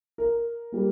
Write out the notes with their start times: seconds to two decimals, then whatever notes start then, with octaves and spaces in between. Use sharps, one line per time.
0.18 A#4
0.72 G3 A#3